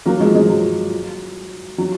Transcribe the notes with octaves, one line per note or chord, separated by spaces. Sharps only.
F#3 A#3
F3 G#3
F3 G#3
F#3
F#3